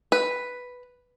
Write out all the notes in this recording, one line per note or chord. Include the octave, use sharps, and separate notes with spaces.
B4